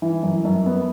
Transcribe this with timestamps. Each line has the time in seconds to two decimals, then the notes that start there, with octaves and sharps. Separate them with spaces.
0.02 E3
0.23 F#2
0.45 F#2
0.66 B3